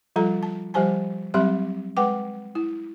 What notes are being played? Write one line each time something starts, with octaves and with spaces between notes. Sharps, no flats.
F3 G3 F4 A4 A#5
A5
F3 G3 G4 C5 G#5 A5
F#3 G3 C4 G4 E5 C6
G#3 B4 F#5 G5 D6
E4